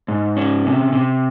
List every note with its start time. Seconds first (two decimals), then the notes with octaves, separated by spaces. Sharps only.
0.08 G#2
0.36 C#4
0.65 C3
0.93 C3